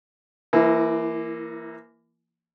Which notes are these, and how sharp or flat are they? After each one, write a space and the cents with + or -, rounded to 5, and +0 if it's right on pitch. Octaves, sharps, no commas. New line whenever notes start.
E3 +30 A#3 +0 E4 -15